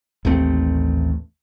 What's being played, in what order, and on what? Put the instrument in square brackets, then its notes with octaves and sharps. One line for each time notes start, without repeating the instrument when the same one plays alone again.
[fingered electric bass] A1 D#2 A3 C4